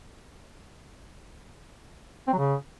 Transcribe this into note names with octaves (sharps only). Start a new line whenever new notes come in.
C4
F#3
C#3